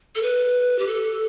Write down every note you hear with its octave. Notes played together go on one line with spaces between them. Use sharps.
A4
B4
G4
A4